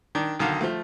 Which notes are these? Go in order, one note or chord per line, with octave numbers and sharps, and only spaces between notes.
D#3 D4
B1 D3 D#3 F5
F3 A3